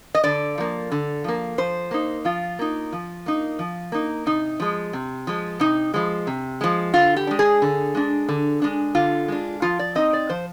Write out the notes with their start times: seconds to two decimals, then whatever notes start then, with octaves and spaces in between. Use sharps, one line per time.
0.15 D#5
0.24 D3 D5
0.58 F3 A#3
0.92 D3
1.24 F3 A#3
1.58 F3 C5
1.91 A#3 D#4
2.25 F3 F4
2.59 A#3 D#4
2.93 F3
3.26 A#3 D#4
3.59 F3
3.92 A#3 D#4
4.26 C3 D#4
4.60 F3 G#3
4.93 C3
5.27 F3 G#3
5.60 C3 D#4
5.94 F3 G#3
6.27 C3
6.61 F3 G#3
6.94 D3 F4
7.17 G4
7.27 G#3 D4
7.39 G#4
7.62 D3
7.95 G#3 D4
8.29 D3
8.62 G#3 D4
8.95 D3 F4
9.28 G#3 D4
9.62 F3 F4
9.79 D5
9.95 C4 D#4 D#5
10.13 D5
10.29 F3 C5